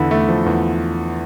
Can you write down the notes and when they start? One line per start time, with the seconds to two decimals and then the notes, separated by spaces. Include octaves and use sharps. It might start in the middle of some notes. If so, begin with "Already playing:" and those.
Already playing: E2 D3 E4
0.11 A3
0.29 F3
0.46 E2